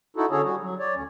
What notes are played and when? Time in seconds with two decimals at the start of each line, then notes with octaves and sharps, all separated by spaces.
0.17 D#4 E4 F#4 A4
0.31 D3 C#4 F#4 G#4 A4 C#5
0.43 G3 F#4
0.60 F#3
0.79 C#5 D5
0.94 D2 C#4